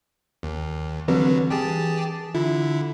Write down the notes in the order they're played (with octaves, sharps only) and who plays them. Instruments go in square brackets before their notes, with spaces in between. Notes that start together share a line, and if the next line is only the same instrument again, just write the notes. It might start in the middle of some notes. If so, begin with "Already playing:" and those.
[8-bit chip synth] D#2
[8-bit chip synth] D3 F#3 G3 [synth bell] E3 C4 B4
[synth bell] E3 [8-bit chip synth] G4 G#4 A5
[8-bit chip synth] D3 E4 [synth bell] F4